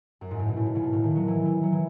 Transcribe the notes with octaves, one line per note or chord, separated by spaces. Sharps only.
F#2
G#2
A2
B2
A2
B2
C#3
B2
A2
D#3
F#3
E3
E3
F#3
E3